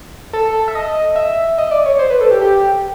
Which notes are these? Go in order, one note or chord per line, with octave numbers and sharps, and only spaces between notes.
A4
E5
D#5
E5
D#5
D5
C#5
C5
B4
A4
G4
G4